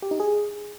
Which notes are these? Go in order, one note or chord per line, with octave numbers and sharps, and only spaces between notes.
G4
D#4
G#4